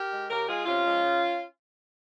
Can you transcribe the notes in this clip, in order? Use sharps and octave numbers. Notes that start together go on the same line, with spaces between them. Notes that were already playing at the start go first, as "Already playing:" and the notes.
Already playing: G4 A#4
G#3
C#3 G4 A#4
G#3 F4 G#4
C3 C#4 F4
F3 G#3
C#3